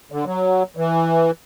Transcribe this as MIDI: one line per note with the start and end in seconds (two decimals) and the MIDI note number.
0.12 0.24 50
0.26 0.63 54
0.77 1.31 52